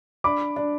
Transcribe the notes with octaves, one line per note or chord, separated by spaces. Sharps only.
D4 B5 D6
D4